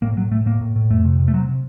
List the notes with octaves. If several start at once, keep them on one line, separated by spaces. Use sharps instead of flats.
A2 A#3
A2 F#3
A2 A3
A2 A#3
A2
A2
F2 A3
C3
C3
A3
C3 F#3
C3